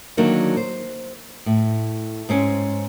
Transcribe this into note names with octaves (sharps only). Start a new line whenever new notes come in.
D3 D#3 F#3 A#3 D4 D#4
C5
A2
G#2 C4 C#4